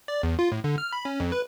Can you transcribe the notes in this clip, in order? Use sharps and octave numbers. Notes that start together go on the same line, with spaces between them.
D5
E2
F4
A2
D3
F6
B5
C#4
F2
B4